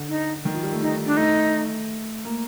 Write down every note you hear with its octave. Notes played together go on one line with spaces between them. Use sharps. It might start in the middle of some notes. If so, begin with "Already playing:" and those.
Already playing: D3
D#4
D#3
F3
G3
A3
D#4
D4
A3 D#4
A#3